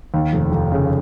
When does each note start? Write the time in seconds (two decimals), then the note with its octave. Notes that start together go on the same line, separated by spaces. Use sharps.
0.14 D#2
0.33 F1
0.52 F1
0.72 C#3